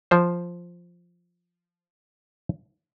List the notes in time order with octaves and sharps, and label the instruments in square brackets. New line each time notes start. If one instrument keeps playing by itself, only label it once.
[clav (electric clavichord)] F3 C5